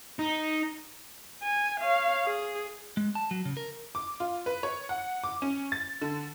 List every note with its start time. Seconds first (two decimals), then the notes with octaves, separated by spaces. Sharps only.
0.19 D#4
1.42 G#5
1.80 C#5 F5
2.26 G#4
2.97 G#3
3.15 A5
3.31 F#3
3.45 C#3
3.57 A#4
3.95 D6
4.20 F4
4.46 B4
4.63 C#5
4.89 F#5
5.24 D6
5.42 C#4
5.72 A6
6.01 D3